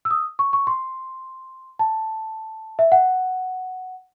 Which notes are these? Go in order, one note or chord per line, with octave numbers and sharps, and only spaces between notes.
E6
D#6
C#6
C#6
C6
A5
E5
F#5